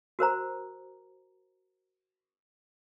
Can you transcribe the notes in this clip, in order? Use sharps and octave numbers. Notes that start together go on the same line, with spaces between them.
F#4 A#4 C5 A#5